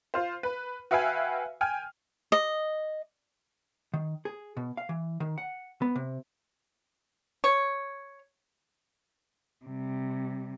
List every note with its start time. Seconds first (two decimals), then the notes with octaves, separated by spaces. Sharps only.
0.14 F4 C5
0.43 B4
0.91 F#4 B4 E5 F5 G5 G#5
1.61 G5 G#5 F6
2.32 D#5
3.94 D#3
4.25 G#4
4.57 B2
4.77 F5
4.89 E3
5.20 D#3
5.38 F#5
5.82 B3
5.96 C3
7.44 C#5
9.65 C3 G3